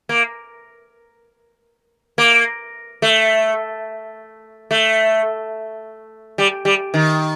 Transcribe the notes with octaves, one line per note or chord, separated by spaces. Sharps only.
A#3
A#3
A3
A3
G3
G3
D#3